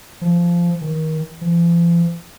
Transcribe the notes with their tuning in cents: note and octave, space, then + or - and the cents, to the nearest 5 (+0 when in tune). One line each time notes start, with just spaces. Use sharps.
F3 -15
D#3 +25
F3 -45